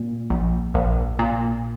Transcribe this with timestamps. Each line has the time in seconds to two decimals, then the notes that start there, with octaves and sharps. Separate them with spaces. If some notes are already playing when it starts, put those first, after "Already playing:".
Already playing: A#2
0.30 A#1
0.74 A#1
1.19 A#2